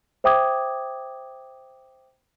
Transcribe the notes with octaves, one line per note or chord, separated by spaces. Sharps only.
C5 E5 G5 D6 D#6 G#6